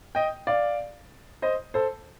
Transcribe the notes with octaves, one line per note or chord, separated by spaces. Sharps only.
D#5 G5
D5 F5
C5 D#5
A4 C5